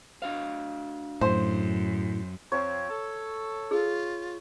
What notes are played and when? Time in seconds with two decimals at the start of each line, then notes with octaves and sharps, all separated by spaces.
0.22 D4 F#4 F5
1.21 F#2 A2 C5
2.52 F2 F3 C4 C#5
2.90 A4
3.71 F4 G#4